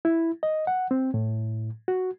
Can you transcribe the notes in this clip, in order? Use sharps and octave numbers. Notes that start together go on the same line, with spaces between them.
E4
D#5
F#5
C4
A2
F#4